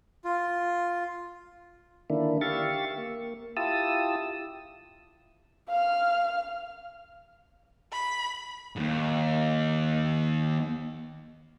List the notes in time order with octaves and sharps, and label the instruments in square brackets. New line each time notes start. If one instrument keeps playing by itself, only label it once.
[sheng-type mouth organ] F4
[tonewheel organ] D3 D#3 A#3 D4 E4
G4 E5 F5 C#6 A6
A#3
E4 F4 G4 A5 D#6 E6
[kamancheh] F5 F6
[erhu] B5
[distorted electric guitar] D#2 G#2